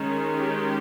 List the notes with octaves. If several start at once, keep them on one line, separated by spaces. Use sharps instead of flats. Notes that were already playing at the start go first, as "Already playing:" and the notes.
Already playing: D#3 G#3 C#4
G4